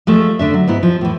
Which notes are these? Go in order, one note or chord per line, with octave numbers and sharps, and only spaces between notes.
F3 G#3 A3
D3 D4 E5
F#3
G#2 B3 E4
F3
A2 E3